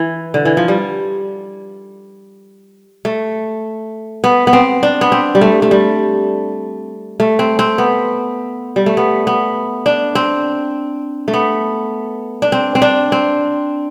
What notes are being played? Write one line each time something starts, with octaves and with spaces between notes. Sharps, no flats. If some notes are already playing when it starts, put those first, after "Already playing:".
Already playing: E3
D3
E3
F3
G3
A3
B3
B3
C4
D4
B3
C4
G3
A3
A3
G3
A3
C4
C4
B3
G3
A3
B3
B3
D4
C4
A3
B3
D4
C4
C4
D4
C4